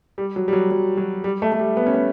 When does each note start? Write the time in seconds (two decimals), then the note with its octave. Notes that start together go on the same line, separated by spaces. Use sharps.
0.18 G3
0.36 F#3
0.48 G3
0.53 F#3
0.71 F#3
0.97 F#3
1.24 G3
1.42 A3
1.52 A3
1.59 G3
1.77 B3
1.87 C#4
1.94 B3